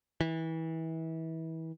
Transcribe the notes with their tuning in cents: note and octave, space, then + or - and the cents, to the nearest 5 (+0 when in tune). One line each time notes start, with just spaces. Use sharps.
E3 -30